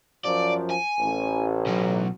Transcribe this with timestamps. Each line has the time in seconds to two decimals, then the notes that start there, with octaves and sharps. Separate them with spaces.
0.25 F#2 F3 D5
0.70 G#5
0.99 A1
1.66 B2 F#3